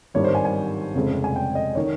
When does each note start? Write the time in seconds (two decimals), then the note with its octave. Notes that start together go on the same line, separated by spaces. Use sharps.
0.14 G#1 G2 D#3 G3 C#5
0.24 C5
0.35 G#5
0.45 G#5
0.95 F1 F2 C#3 G#3 C4
1.24 G#5
1.36 G5
1.55 D#5
1.75 D#3 C#5